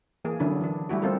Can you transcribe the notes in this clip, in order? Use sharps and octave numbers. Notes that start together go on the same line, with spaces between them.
E3 A#3 G#4
D3 F#3 C#4 D4 E4
E3 D4
G3 A3 E4 F#4
C4 F4 A4 A#4